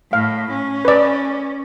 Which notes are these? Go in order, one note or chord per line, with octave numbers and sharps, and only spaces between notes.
A2 F5
C#4
B4 D5